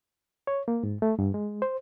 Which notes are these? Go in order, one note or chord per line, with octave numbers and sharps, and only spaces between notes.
C#5
A#3
G#2
A3
G2
G#3
C5